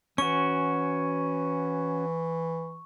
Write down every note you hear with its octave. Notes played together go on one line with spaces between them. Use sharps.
E3 C#4 F#4 C#6